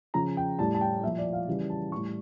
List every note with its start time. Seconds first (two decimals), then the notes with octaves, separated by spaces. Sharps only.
0.14 C#3 F3 A#5
0.37 G5
0.59 A2 G3 A5
0.74 A5
0.81 G5
1.04 A#2 E5
1.07 F3
1.18 D5
1.33 F5
1.48 C#3 E3 G3
1.70 A5
1.92 G3 C#6
1.97 A2